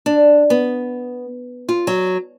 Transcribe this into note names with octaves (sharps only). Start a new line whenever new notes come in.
D4
B3
F4
F#3